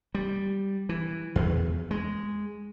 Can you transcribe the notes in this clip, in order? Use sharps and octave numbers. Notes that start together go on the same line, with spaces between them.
G3
E3
E2
G#3